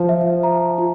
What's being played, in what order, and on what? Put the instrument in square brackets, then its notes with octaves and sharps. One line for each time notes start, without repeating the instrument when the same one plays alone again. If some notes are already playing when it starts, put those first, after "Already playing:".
Already playing: [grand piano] F3 [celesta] C5
[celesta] E5
A#5
F4